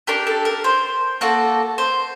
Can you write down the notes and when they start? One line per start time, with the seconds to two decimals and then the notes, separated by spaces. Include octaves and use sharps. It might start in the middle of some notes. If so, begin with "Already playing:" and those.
0.07 D4 G4 A#4
0.27 A4
0.45 A#4
0.64 C5
1.21 A#3 F#4 A4
1.78 C5